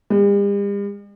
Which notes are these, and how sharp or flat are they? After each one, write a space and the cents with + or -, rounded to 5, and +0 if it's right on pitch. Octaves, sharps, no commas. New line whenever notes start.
G3 +45